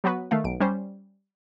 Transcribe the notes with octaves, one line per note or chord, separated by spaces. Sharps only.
F#3 B3 F#4 B4
D#3 A3 F5
B1 D7
G3 C#4 C5